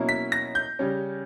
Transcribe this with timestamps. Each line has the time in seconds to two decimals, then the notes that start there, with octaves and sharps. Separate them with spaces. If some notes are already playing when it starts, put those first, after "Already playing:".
Already playing: B2 F#3 A#3 C#4 E4
0.09 B6
0.32 A#6
0.55 G6
0.79 C#3 G3 C#4